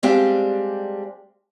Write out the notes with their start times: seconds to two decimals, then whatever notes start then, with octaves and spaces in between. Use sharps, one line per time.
0.03 G3 G#3 C4 D4 G4 F5